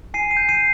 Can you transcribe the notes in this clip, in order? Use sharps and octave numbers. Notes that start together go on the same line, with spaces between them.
G#5 C7 D#7
C7 D#7
G6
C7 D#7